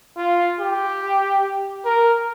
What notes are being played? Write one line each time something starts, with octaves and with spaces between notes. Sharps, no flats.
F4
G4
A#4